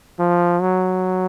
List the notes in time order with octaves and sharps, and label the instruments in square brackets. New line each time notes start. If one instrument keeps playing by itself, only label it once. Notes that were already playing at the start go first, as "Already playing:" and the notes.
[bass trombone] F3
F#3